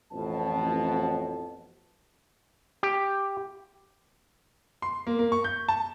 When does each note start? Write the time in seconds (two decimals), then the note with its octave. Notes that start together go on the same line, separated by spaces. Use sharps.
0.12 A1 F2 B2 A5
2.83 G4
4.82 C6
5.07 A#3
5.19 A#3
5.32 C#6
5.44 G6
5.68 A5